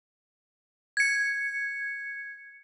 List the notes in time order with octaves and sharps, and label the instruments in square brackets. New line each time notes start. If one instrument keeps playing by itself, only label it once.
[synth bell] G#6 C#7